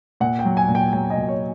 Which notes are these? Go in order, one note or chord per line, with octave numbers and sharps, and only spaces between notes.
A#2 F#5
G5
F#3
G#5
A#2
G5
F#3 G5
D#5
A#2
C#5